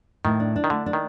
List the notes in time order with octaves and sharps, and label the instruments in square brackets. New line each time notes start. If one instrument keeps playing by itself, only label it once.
[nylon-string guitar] A2 [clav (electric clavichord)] D#3
[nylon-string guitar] D4
D4
[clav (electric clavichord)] D#3
[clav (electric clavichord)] D3 [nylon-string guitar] A3
[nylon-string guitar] D4
[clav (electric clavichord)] D#3